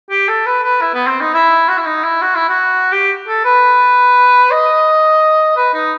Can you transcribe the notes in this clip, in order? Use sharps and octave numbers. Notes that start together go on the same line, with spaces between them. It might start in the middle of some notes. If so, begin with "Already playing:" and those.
G4
A4
B4
B4
E4
B3
C4
D#4
E4
F#4
E4
D#4
E4
F#4
E4
F#4
G4
A4
B4
D#5
B4
D#4